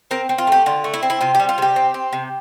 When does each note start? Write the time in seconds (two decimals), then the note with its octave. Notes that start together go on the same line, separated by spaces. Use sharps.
0.11 C4 A#4
0.29 C4
0.38 F4
0.47 A3 G4
0.66 D3 F4
0.84 A3
0.94 E4
1.03 C4
1.10 E4
1.21 C3 F4
1.35 G4
1.40 G3
1.49 F4
1.58 C3 G4
1.76 C4
1.94 C4
2.13 C3